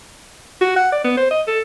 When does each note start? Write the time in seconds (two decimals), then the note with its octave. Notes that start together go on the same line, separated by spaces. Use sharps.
0.61 F#4
0.76 F#5
0.92 D5
1.04 B3
1.17 C5
1.31 D#5
1.47 A4